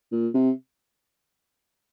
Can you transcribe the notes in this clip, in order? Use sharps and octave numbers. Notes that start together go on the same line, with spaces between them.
A#2
C3